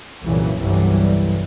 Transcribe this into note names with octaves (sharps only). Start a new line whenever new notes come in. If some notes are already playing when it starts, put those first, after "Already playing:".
C2 F#2 A#2 C#3 E3 F#3
G1 C2 G2 E3 F#3 G3